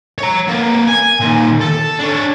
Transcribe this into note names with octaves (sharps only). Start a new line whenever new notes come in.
C#5 A#5
A#3 B3
G#5
A#2 D#3
A4
D4 C#5